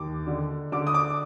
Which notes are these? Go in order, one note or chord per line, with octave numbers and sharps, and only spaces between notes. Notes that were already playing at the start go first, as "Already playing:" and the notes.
Already playing: D#2 D6
D3
D3 D6
D#6
D6